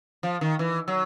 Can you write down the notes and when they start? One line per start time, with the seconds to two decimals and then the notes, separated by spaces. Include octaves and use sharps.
0.23 F3
0.41 D#3
0.59 E3
0.88 F#3